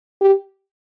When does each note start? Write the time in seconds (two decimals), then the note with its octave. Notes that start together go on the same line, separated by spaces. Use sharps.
0.21 G4